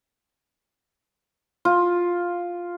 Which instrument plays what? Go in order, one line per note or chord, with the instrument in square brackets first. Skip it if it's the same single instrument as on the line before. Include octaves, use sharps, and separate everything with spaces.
[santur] F4